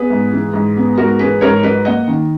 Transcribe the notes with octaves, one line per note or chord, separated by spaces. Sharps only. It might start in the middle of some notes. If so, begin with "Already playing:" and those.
Already playing: B3 G#4 B4
G#2
E3
G#2
B3
G#2 F#4 A#4
E3 G#4 B4
G#2 A#4 C#5
F#3 B4 D#5
A#3 D#5 F#5
D#3